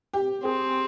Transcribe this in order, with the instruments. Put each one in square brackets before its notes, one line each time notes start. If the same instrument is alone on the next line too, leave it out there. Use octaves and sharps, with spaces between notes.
[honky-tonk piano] G4
[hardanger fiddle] C4 [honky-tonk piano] G#4